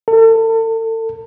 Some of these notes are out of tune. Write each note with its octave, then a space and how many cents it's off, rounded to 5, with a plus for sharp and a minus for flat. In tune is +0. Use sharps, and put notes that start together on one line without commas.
A4 +40